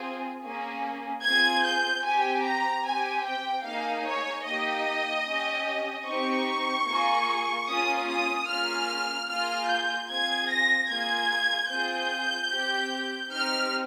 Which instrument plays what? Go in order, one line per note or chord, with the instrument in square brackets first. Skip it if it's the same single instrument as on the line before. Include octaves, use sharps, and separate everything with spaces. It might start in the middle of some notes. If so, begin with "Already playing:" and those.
Already playing: [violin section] C4 F4 G#4
A#3 C#4 G#4
C4 F4 G#4 G#6
G6
C4 G4 G#5
A#5
C4 G4 G#5
G5
A#3 D#4 G#4 F5
C#5
A#3 D#4 G4 D#5
C#4 G4
C4 D#4 G4 C#6
A#3 F4 G#4
A#3 C#4 F4 G#4 D#6
D#6
A#3 C#4 F4 G#4 F6
A#3 F4 G#4 F6
G6
C4 F4 G#4 G#6
A#6
A#3 F4 G#4 G#6
C4 F4 G#4 G6
C4 G4
C4 D#4 G4 F6